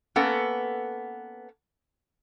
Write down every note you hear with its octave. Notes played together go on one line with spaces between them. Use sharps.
A#3 B3 C#4 A4 F#5